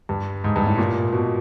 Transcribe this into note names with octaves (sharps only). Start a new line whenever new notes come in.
G2
G#2
G2
A2
A#2
B2